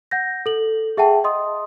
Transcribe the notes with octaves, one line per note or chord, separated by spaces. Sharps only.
F#5 G6 A#6
A4 F#7
G#4 E5 F#5 G5 A5
D#5 C6 D#6